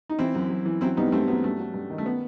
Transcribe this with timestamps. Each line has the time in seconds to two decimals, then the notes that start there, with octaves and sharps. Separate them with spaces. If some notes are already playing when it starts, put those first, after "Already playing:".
0.09 D#4
0.19 E3 C4 E4
0.35 F#2
0.50 F#2
0.65 E3
0.81 F#3 C4 E4
0.97 G2 B3 D#4
1.12 G2 A3 C4
1.28 F#3 B3
1.44 G2 A3
1.60 F#3
1.74 G2
1.90 D#3
1.98 A3
2.06 B3